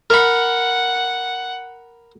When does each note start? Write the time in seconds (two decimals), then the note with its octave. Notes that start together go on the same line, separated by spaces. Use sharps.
0.10 A#4 F#5 B5